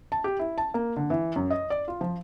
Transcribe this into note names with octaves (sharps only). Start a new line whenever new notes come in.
A5
G4
E4
A5
A#3
D3
E3
F#2
D#5
D5
F4
F3